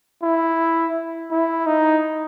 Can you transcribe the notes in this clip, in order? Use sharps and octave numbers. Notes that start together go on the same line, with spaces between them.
E4
E4
D#4